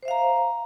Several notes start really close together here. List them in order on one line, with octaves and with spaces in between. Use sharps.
C5 E5 F5 A#5